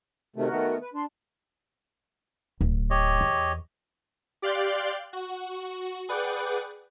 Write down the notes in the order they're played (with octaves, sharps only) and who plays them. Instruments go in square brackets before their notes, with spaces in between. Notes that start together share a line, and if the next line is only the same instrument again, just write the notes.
[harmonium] C3 D#3 A3 [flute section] F#4 A#4
[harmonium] D#3 A3 B3
B4
[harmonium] D4 [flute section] C6
[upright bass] D1
[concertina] G4 C#5 D#5
[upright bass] E2
[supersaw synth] G4 D5 F5 C6 F#6 G6
F#4
G#4 B4 D5 F#5 G5